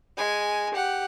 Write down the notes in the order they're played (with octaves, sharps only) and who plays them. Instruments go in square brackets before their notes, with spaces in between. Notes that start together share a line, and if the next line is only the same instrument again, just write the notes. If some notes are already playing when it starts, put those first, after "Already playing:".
[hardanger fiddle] G#3 G#5
G4 F#5